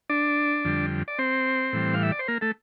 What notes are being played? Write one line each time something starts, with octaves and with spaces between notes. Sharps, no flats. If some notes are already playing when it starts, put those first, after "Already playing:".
D4 D5
F2 D3 G3
D5
C4 C5
A2 E3 G3
F5
E5
D5
C5
A#3 A#4
A3 A4